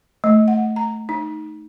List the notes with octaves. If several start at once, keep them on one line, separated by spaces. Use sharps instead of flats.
A3
F#5
A#5
D#4